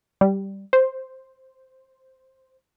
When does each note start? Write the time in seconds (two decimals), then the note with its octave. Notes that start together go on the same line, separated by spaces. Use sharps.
0.21 G3
0.73 C5